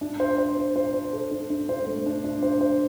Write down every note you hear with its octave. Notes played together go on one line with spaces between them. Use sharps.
D4
C5
C5
C5
C5
C5
A4
D4
D4
C5
A3
D4
D4
C5
C5